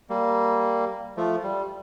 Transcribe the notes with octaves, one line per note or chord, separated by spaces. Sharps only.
G3 A#3
F3 A3
G3